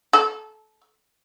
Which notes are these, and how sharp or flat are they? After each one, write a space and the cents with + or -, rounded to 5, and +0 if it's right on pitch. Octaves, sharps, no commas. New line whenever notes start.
A4 -25